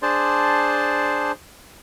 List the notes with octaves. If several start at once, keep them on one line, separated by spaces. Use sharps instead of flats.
D4 G#4 C5 D5 A5 C6